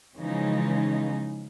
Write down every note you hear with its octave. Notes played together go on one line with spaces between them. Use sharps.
C#3 E3 F3 G#3 D#4